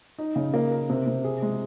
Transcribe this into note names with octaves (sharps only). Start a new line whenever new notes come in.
D#4
C#3
A#3
A#4
C3
C3
G#4
G#3